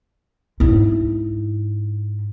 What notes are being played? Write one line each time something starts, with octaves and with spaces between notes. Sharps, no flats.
G#2 E4